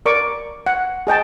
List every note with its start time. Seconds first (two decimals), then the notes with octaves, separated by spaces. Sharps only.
0.06 A#4 D5 C#6 D6
0.66 F#5
1.07 G#4 D#5 G5 A5